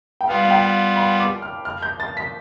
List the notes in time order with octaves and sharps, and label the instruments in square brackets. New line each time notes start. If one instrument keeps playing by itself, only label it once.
[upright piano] G5
[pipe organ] G3 B3 F4 [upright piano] F5
[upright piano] F5
G5
B5
D6
F6
F6
G6
A6
B6